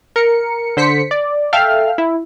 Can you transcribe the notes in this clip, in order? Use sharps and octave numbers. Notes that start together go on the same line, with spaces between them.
A#4 C#7
D3 C5 B6 C#7
D5
A4 E5 F5 G5 F6
E4